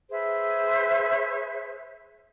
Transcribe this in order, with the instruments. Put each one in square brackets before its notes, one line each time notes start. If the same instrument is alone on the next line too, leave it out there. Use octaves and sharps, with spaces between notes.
[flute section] G#4 B4 C5 E5